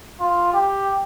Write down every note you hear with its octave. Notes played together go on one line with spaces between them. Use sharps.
F4
G4